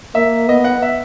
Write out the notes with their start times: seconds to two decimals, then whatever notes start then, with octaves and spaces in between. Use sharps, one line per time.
0.15 A#3 E5
0.48 B3 D#5
0.64 F#5
0.82 E5